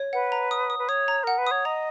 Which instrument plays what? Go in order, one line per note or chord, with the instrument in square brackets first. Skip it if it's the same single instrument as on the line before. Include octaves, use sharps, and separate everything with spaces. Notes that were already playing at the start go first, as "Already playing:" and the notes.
Already playing: [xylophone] C#5
[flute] B4 [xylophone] F#5
[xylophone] A#5
D#6
D#6
[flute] B4
[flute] C#5 [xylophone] D#6
[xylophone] A#5
[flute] A#4 [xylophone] F#5
[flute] B4
[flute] C#5 [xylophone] D#6
[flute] D#5 [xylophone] A#5